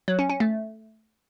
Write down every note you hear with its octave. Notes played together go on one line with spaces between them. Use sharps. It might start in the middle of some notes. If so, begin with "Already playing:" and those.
F#3
C#4
C#4
A3